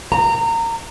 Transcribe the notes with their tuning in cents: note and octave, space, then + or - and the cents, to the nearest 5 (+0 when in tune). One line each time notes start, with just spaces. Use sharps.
A#5 -25